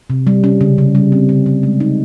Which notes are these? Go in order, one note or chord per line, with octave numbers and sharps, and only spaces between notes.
C3
G3
C#4
C#3
C#3
G3
C4
C#3
C#3
G#3
D#4